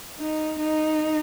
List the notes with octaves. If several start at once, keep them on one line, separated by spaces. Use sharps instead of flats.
D#4
D#4